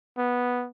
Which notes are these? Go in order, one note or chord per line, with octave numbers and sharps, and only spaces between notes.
B3